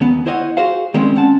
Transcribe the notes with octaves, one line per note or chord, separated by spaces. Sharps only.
D#2 B3
E4 C5 C#5 D#5 F5 F#5
F#4 G#4 C5 F5
D#3 G3 G#3 A#3 C4 C#4
C4 C#4 F#5 A5